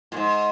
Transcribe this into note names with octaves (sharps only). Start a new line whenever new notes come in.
A#2
G#2